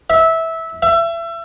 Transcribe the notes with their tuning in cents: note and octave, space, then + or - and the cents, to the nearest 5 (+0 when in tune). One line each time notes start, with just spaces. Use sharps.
E5 -15
E5 +30